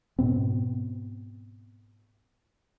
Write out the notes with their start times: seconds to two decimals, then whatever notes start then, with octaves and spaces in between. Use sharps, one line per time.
0.19 G#2 B2 B3 C4